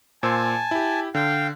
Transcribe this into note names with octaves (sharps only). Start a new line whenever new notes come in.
A#2 C5 G#5 A5 E6
E4 G4
D3 F5 G5